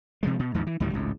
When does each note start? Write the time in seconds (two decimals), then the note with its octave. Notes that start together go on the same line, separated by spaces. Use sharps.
0.23 C3 F3 G#3
0.39 B2
0.54 D#2 G#2 F3
0.67 E3
0.80 D2 A2 D#3 G3
0.94 G#1 C#2 A2